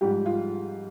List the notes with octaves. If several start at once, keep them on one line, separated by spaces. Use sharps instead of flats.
G#2 F3 G3 G4
F4